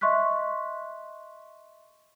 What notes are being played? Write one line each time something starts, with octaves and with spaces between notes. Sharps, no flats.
D#5 E5 C6 C#6 F#6 B6